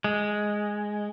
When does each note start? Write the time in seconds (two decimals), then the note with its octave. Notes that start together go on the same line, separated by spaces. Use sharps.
0.04 G#3